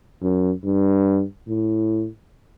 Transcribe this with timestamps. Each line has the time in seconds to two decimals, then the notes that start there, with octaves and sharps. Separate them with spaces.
0.22 F#2
0.65 G2
1.48 A2